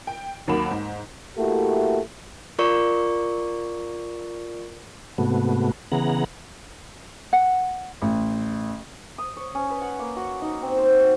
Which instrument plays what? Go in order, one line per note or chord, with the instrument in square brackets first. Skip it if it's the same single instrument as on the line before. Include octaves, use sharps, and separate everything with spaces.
[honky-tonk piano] G5
D#2 F#3 A#3 F#5 B5 E7
G#2
[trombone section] A3 A#3 E4 F#4 G4
[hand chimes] F4 A#4 D5 C#6
[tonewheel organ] G#2 C3 A3 B3 F#4
C#3 E3 B3 G#4 F#5 A#5
[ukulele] F#5
[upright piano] A1
[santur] D#6
C#5
C#4
B4
F#5
A#3
F#4
D#4
C4
C5
F#4